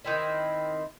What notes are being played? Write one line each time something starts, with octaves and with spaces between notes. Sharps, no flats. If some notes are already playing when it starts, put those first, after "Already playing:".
D#3 C4 E4